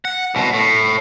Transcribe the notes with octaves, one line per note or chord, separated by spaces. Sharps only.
F#5
C2 B2
A2